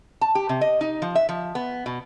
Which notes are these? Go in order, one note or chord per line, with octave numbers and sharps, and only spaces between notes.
A5
G4
C3
D#5
D#4
F3
E5
F3
B3
B2